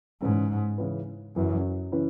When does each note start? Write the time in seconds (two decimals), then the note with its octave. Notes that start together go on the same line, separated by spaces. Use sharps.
0.22 G#2 C#3 E3 C#4 E4 B4
0.78 C#3 E3 C#4 E4 B4
1.36 F#2 C#3 E3 C#4 E4 B4
1.92 C#3 E3 C#4 E4 B4